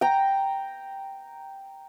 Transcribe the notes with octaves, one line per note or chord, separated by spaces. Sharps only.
G5 A#5